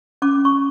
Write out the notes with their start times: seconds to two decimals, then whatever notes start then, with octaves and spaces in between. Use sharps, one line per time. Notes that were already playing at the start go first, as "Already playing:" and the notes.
0.22 C#4 D6
0.45 C#6